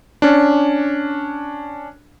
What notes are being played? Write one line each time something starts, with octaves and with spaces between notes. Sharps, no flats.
C#4 D4